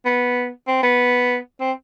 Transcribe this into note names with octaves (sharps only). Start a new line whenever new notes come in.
B3
C4
B3
C4